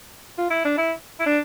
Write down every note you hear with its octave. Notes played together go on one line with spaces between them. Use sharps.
F4
E4
D4
E4
E4
D4